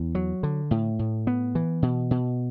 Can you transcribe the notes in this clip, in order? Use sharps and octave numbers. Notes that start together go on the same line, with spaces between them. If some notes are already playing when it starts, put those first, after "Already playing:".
Already playing: E2
F#3
D3
A2
A2
B3
E3
B2
B2